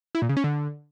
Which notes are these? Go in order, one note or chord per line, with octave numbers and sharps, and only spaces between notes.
E4
A#2
C#3
C#4
D3